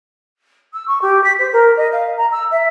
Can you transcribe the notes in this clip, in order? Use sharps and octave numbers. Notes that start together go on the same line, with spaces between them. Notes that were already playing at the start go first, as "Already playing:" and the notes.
E6
C#6
G4
B6
C5
A#4
D#5
F5
A#5
E6
E5